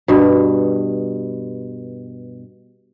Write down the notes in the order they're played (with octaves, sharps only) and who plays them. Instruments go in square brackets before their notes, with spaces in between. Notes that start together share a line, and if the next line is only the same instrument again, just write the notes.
[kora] G2 B2